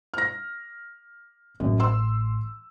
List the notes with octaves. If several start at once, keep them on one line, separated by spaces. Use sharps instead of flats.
F6 A#6
A1 F#2
C6 E6